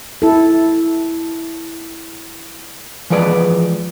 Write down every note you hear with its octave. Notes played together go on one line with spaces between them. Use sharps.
E4 A4
E3 F3 G#3 B4 D5